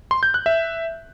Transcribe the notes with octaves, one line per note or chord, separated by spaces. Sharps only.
C6
G6
F#6
E5